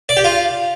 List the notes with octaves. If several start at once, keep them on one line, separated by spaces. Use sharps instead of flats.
D5
G4
F4